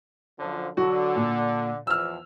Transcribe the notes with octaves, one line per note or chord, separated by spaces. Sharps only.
F#2 D3 F3
D3 F#3 F#4
A#2
E2 F3 E6 F6